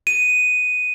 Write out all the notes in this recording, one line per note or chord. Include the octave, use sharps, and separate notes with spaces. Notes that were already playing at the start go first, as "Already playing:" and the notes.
D#7